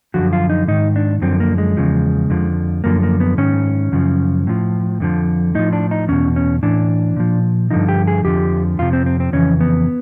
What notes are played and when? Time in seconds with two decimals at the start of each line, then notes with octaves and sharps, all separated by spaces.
0.14 F#2 D3 F3 F#4
0.33 F4
0.50 D#4
0.68 G#2 D#3 D#4
0.96 D4
1.22 F#2 D3 F3 C4
1.40 A#3
1.58 G#3
1.77 E2 C#3 F3
2.30 F2 D3 F3
2.84 F#2 D3 F3 A#3
3.03 A#3
3.20 B3
3.38 G#2 D#3 C#4
3.92 F#2 C#3 F3
4.47 A2 F3
5.00 F2 D3 F3
5.55 A2 F3 D#4
5.73 D4
5.91 D#4
6.08 E2 B2 C#4
6.36 C#4
6.63 A2 E3 D4
7.16 A#2 F3
7.71 G2 D3 F3 D#4
7.89 G4
8.07 G#4
8.25 F2 D3 F3 G4
8.79 F2 C3 F3 F4
8.93 C4
9.06 C4
9.20 C4
9.33 F2 C#3 E3 C#4
9.61 B3